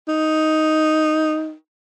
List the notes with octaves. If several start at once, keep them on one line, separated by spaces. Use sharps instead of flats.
D#4